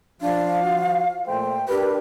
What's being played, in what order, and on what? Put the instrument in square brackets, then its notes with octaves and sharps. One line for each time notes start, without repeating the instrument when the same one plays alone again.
[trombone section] F3 [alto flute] D4 [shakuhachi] F5
[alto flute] F#4
[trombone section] A#2 A3 C5 [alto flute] G5
[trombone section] D4 B4 [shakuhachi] G4 [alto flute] A#4